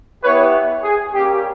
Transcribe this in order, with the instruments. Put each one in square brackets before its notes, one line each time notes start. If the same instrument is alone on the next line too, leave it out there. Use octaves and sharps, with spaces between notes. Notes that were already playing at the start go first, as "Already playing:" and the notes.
[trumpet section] B3 E4 G4 B4 C#5
G#4
G3 A#3 C#4 G4